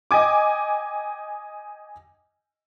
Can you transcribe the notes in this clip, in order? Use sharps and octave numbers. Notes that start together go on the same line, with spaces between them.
D#5 G5 G#5 D6